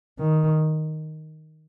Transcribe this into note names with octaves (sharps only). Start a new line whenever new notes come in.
D#3